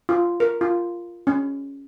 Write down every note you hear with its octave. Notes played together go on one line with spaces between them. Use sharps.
F4
A#4
F4
C#4